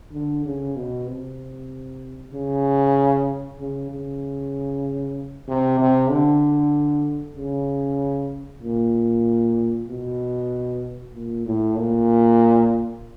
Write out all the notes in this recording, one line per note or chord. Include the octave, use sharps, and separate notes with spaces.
D3
C#3
B2
C3
C#3
C#3
C#3
C3
C3
D3
C#3
A#2
B2
A#2
A2
A#2